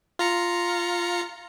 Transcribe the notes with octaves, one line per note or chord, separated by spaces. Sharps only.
F4 A#5 C#7